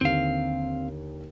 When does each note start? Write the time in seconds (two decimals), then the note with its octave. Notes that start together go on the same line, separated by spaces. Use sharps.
0.01 D#2 D3 C4 F5